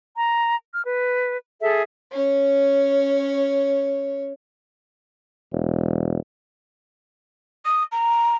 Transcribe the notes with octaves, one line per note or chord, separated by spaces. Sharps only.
A#5
F6
B4
G#4 A4 E5
C#4 C#5
E1
D#6
A#5